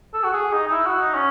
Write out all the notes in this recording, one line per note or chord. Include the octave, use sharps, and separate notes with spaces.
A4
F#4
G#4
D#4
D#4
E4
F#4
D#4
C#4